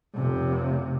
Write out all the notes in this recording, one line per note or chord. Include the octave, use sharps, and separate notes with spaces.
F1 C3